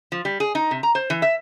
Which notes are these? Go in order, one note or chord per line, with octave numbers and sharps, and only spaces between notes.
F3
G3
G#4
D#4
C3
A#5
C5
E3
E5